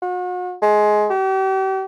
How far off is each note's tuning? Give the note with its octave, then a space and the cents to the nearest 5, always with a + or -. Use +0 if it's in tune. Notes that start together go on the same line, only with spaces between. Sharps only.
F#4 -40
G#3 +20
G4 -40